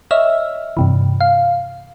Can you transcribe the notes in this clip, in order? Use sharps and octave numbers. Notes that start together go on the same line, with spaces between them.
C#5 D#5 E5 E6 F6
G2 C3 E3
F5